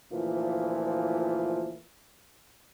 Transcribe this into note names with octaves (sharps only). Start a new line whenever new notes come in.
D2 A#2 E3 F3